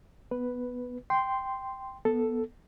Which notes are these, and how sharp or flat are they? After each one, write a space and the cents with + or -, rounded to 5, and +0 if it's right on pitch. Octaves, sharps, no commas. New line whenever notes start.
B3 +0 B4 +0
G5 +0 C6 -5
B3 -15 A4 +0